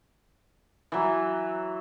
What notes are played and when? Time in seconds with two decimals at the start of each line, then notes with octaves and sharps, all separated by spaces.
0.92 E3 F#3